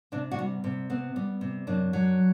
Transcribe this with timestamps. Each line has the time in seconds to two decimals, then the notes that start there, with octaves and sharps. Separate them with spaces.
0.12 C3 D4
0.31 D4 F#4
0.39 G3
0.64 C3
0.90 B3 C4
1.16 G3
1.41 C3
1.67 F#2 D4
1.93 F#3